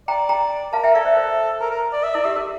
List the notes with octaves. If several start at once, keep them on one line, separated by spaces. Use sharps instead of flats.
D5 G5 A#5
G5 A#5
A#4 F5 A5
E5 G5
A4 D5 F5
C5 E5
C5
A#4
A#4
D5
E5
E4 D5
G4 E5
A#4